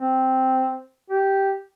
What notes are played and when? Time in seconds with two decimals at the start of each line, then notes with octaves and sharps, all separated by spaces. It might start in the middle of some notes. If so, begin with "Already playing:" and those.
0.01 C4
1.10 G4